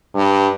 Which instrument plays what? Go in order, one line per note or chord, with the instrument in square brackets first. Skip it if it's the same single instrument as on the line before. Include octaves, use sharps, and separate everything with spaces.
[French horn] G2